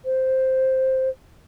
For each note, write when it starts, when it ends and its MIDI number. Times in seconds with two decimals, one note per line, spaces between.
0.04 1.09 72